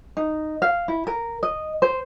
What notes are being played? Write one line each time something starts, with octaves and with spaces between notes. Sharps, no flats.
D#4
F5
E4
A#4
D#5
C5